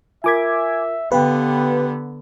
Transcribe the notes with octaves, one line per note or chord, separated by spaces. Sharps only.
F4 A#4 E5 G#5 D6 G#6 B6
D3 B3 G4 B4 F5 G5